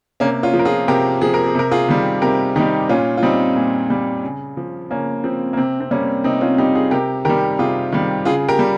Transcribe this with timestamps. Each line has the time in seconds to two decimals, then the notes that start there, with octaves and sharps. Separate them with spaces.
0.20 C3 A#3 C#4
0.43 C#4 F4
0.54 F3
0.59 A#4
0.65 F4 G#4
0.88 C3 G4 A#4
1.21 F3 G#4
1.34 A#4
1.46 G#4
1.55 C3 A#4
1.71 F4 G#4
1.88 D#3 G3
2.22 C3 G4 A#4
2.56 D#3 G3 D#4 G4
2.89 A#2 C#4 F4
3.17 F4
3.23 G3 C4 D#4
3.56 A#2
3.90 G3
4.23 C#3
4.57 F3
4.90 C#3 A#3 C#4
5.24 F3 C4
5.53 A#3
5.57 C3 C4
5.80 C4
5.91 G3 A#3 C#4
6.24 C3 C4 D#4
6.41 C#4 F4
6.58 G3 D#4 G4
6.75 F4 G#4
6.91 C3 G4 A#4
7.25 D#3 G3 G4 A#4
7.59 C3 F4 G#4
7.92 D#3 G3
8.25 C#3 F4 G#4
8.48 G4 A#4
8.59 G3